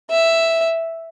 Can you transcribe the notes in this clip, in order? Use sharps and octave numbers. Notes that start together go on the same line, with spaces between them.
E5